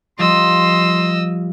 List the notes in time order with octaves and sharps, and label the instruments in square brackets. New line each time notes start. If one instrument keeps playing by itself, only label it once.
[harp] F3 G3 [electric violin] D#5 E6 [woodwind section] C6